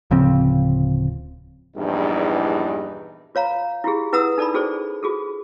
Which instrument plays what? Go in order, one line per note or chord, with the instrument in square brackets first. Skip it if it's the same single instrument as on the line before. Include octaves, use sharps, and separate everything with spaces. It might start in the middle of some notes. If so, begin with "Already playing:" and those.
[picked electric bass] D1 C#3 F3 C4
[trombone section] A#1 E2 G2 E3 D#4
[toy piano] F4 C#5 F5 A#5
E4 F4 G4 G#4
E4 B4 F#5 A#5 D#6 E6
D#4 A4 D5 A5 B5
C#4 F#4 G#4 A4 C5 D5
F4 F#4 G#4 A4